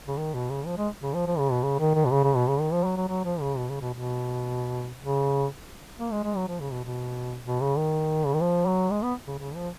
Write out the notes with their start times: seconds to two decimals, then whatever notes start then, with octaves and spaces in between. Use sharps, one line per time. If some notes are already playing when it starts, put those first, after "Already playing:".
0.08 C#3
0.17 D#3
0.34 B2
0.50 C#3
0.66 F3
0.78 G#3
1.02 C#3
1.14 F3
1.27 F3
1.39 C#3
1.51 B2
1.63 C#3
1.79 D#3
1.95 D#3
2.05 B2
2.11 C#3
2.24 C#3
2.35 B2
2.48 C#3
2.60 D#3
2.72 F3
2.84 F#3
2.97 F#3
3.08 F#3
3.25 F3
3.41 C#3
3.57 B2
3.69 C#3
3.81 B2
3.94 B2
5.03 C#3
5.99 A#3
6.12 G#3
6.24 G#3
6.36 F#3
6.48 F3
6.60 C#3
6.72 B2
6.85 B2
7.45 B2
7.61 C#3
7.77 D#3
8.25 C#3
8.34 D#3
8.41 F3
8.66 F#3
8.90 G#3
9.03 B3
9.27 C#3
9.39 C#3
9.55 F3